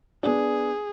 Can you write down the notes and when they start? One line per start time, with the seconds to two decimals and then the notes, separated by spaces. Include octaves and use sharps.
0.23 B3 D4 G#4